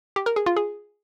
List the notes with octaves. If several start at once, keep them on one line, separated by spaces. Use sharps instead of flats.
G4
A#4
G#4
F4
G#4